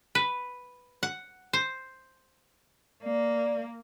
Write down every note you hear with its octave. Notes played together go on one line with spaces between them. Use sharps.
B4
F#5
C5
A#3 D5